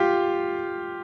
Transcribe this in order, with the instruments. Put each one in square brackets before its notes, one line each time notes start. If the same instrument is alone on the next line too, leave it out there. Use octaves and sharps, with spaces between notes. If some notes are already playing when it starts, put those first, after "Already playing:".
Already playing: [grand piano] F4 G4